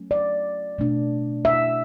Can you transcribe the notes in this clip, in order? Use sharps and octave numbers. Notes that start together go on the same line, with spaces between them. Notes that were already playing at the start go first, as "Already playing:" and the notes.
Already playing: F#3 A3 C#4
D5
B2 A3 D4
E5